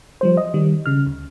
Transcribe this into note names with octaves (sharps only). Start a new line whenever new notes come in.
F3 G3 C5
D#5
D#3 G3
C#3 F6
D2